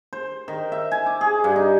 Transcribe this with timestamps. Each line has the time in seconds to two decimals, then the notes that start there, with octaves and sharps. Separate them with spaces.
0.13 C5
0.48 D#3
0.72 E5
0.92 G#5
1.06 D6
1.21 G#4
1.44 G2
1.56 D#4